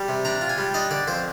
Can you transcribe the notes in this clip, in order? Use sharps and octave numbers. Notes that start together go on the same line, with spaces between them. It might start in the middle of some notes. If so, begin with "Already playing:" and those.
Already playing: G3
C3
D4 A#5
F4
G#5
G3
D4 D#5
D3 D5
F2 C5